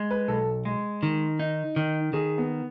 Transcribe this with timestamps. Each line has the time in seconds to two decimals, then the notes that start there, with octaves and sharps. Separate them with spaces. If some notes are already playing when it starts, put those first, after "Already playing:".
Already playing: G#3
0.11 B4
0.28 B1 A4
0.65 G#3
1.03 D#3
1.40 D#4
1.76 D#3
2.13 D#3 G#4
2.38 B3